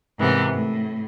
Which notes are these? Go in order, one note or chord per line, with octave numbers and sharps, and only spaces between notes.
G#2 C3 E3 A#3 B3
A2